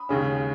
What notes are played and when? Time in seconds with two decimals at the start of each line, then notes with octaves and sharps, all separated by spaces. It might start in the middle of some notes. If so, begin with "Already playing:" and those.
Already playing: B5 D#6
0.09 D#2 C#3 G#3 C#4